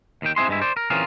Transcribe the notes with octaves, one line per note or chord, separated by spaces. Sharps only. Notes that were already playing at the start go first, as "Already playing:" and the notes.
D#2 D#3 G5
C4 E4 G#4 C6
G2 G#3 E4
C5 D5
A#4
E3 C4 C#4 F4 G#4 A#4